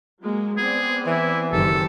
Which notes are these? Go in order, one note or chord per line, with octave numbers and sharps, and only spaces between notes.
F#3 G#3 A#3
B3 C4 G#4 D5
E3 E4
F#1 D#3 G4 A4 C5